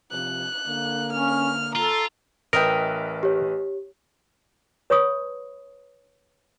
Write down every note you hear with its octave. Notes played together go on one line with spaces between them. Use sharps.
C3 F3 F#6
D3 A#3
C#4 F6
F4 A4 A#5
A1 A#4 B4 D#5 E5 G5
G4 C#5
B4 C#5 B5 C#6 D#6